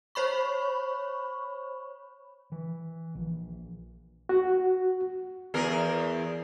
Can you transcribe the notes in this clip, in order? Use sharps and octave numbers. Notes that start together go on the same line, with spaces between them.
C5 C#5 B5 C#6
E3
A#1
F#4
E2 G#4 A#4